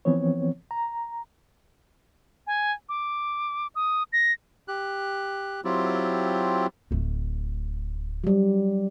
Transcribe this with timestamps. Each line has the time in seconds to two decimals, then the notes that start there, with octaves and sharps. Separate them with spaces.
0.05 E3 F3 B3 C4 C#5
0.71 A#5
2.47 G#5
2.89 D6
3.75 D#6
4.13 A#6
4.68 G4 F#6
5.64 F#3 C4 E4 F4 G4
6.91 D1 A3
8.24 F#3 G3